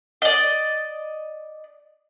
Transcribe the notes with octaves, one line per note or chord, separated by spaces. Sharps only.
D5 D#5